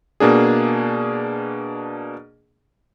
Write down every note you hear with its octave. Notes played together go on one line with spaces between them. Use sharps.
B2 A#3 D4 G#4